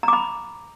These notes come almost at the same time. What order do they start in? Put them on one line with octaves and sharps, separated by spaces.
A#5 D6 B5